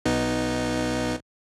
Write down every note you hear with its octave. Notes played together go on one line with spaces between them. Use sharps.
B1 B3 D#4